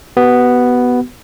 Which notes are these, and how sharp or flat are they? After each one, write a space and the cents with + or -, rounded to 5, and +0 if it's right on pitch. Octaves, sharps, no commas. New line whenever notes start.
B3 +0 F#4 +45